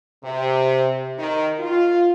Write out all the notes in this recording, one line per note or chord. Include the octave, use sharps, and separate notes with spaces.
C3
D#3
F4